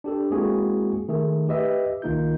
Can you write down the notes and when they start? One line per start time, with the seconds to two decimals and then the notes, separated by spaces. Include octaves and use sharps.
0.04 D4 G4 A4
0.31 G#3 A#3 C4 E4 F#4 G#4
1.08 D#3 A3 G#4
1.49 G4 B4 D#5 E5
2.02 C2 D#3 A#3 D#4 F4 G6